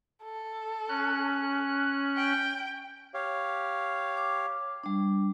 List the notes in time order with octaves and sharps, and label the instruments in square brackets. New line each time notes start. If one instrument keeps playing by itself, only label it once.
[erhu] A4
[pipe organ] C#4 F#6
[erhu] G5
[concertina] G4 C#5 F5
[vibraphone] D6
G3 D4